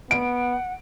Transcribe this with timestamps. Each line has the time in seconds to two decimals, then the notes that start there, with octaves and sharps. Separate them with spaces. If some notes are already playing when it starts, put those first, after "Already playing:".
0.11 B3 F#5 D7